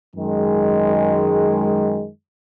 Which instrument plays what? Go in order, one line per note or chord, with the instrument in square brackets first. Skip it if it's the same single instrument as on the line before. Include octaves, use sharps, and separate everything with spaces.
[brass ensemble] F#2 D#3 G#3